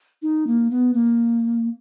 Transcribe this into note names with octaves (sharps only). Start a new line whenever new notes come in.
D#4
A#3
B3
A#3